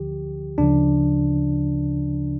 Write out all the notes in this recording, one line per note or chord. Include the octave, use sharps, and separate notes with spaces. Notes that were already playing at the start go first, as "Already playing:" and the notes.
Already playing: D2 D3 F3 G4
D2 C#3 F3 D4